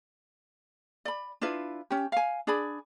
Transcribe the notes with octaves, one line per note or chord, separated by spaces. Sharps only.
D5 B5
D4 E4 F4 B4
C#4 G4
F5 G#5
D4 G#4 D5 B5